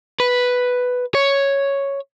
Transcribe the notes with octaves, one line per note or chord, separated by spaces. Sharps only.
B4
C#5